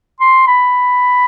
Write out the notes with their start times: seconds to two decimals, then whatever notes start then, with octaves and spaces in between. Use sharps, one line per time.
0.20 C6
0.47 B5